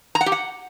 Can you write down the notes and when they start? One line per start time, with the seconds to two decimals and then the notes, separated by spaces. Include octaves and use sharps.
0.15 A#5
0.21 F#5
0.26 G4
0.32 F#5